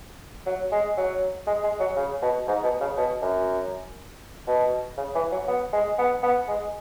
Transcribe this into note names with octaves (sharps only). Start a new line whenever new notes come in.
F#3
G#3
F#3
G#3
G#3
F#3
C#3
B2
G#2
B2
C#3
B2
F#2
B2
C#3
E3
F#3
B3
G#3
B3
B3
G#3